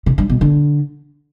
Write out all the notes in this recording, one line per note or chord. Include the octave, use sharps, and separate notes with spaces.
C3
G2
B2
D3